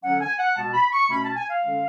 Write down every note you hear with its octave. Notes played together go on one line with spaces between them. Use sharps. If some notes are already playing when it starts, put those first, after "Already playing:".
D3 F#3 C#4 F#5
G#5
F#5
B2 G#3 B3 A5
B5
C#6
B2 A3 C#4 B5
A5
G#5
F5
D3 G#3 C#4